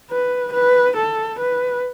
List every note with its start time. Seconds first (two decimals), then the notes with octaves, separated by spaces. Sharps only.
0.11 B4
0.53 B4
0.97 A4
1.40 B4